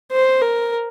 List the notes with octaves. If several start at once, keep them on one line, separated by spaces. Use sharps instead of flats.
C5
A#4